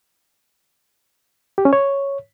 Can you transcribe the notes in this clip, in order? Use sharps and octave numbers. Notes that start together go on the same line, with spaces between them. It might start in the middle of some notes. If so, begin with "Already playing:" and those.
G4
C#4
C#5